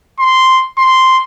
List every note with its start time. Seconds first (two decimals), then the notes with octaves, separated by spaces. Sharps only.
0.19 C6
0.78 C6